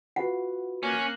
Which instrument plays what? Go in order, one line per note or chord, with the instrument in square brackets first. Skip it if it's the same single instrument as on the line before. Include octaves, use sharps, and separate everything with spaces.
[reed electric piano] F4 F#4 B4 [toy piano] F#5
[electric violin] A#3 F#6 [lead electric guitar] C#4